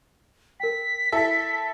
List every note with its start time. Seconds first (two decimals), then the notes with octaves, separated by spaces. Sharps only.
0.60 A#4 G5 B6
1.12 E4 A4 E5